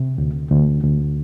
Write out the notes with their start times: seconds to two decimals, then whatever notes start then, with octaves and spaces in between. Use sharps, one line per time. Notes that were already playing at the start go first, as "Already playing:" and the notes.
Already playing: C3
0.18 D2
0.51 D2
0.83 D2